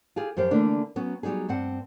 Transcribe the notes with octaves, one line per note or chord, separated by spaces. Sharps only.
F4 G4 G#4
F#2 F3 G4 C5
D3 E3 A3 A#3 D4
F#3 B3 C#4
F#3 G3 D4 D#4 G#4
G2 C4 F#5